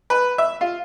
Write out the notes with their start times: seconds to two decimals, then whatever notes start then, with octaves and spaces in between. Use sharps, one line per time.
0.10 B4
0.38 E5
0.61 F4